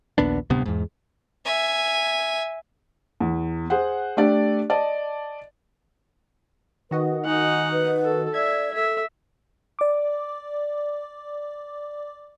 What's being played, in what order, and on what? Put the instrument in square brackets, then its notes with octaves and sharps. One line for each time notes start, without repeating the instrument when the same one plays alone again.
[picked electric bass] A#1 D#2 B3 D4
D1 G2 C3 B3
E2 G#2
[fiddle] E5 G#5
[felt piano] E2
G#4 C5 F#5
A3 D4 G4 D5
D5 D#5 A5
[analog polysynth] D#3 F#4 D#5 [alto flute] B4
[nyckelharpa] D#4 F#5 [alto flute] G#5
[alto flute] B4
[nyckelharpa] A4
[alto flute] D5 [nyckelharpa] E5 [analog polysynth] G#6
[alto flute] A4 [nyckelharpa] E5
[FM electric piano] D5 D6